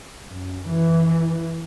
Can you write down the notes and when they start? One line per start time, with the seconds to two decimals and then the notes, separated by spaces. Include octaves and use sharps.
0.28 F#2
0.67 E3